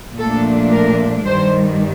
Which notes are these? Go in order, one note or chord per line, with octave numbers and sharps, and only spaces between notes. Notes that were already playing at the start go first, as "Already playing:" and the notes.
A#2 F3 A3 D4 A4
A#4
G2 D#3 G3 C5